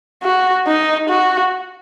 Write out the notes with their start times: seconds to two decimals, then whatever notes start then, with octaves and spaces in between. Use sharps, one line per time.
0.23 F#4
0.67 D#4
1.09 F#4